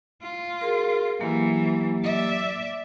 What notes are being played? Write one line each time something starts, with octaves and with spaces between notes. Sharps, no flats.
F4
F#4 G#4 A#4
E3 F#3 A#3 G4
D5 E5